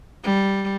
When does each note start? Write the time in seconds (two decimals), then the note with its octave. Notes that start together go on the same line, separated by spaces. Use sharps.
0.24 G3